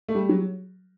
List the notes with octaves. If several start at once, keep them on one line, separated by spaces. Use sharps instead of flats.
A3
G3
F#3